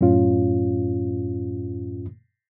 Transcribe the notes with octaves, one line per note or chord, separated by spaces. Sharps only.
F#2 A2 C#4 F4